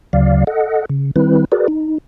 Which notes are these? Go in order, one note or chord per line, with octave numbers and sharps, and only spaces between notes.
D2 C#3 F#3 D5 F5
A4 D#5 F#5
C#3
D#3 G3 C4 E4 B4
F#4 G#4 A#4 B4 D5
D#4